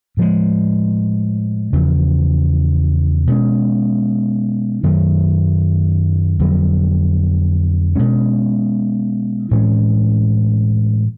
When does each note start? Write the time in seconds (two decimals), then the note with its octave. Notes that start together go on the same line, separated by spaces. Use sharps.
0.17 A2 F3 G#3
1.73 E2 C#3 F3
3.27 B2 G#3 C#4
4.83 F#2 D#3 F#3 A3
6.39 F2 D3 F#3
7.95 B2 G#3 C#4
9.51 A2 E3 G#3 C#4